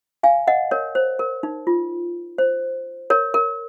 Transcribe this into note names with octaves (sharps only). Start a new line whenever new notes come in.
F5 G#5
D#5 F#5
A#4 C#5
C5
A#4
D#4
F4
C5
A#4 C#5
A#4